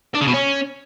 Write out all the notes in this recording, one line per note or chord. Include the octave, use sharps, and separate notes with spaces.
D4
C#3
B2
C#4